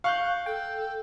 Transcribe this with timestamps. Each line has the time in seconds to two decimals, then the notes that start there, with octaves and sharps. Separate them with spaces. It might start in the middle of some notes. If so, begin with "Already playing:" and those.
0.04 F5 C#6 F#6 G6
0.46 A4 G5